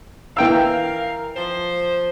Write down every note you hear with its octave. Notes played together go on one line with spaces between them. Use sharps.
E3 A#4 F5 G5 E6
F3 C5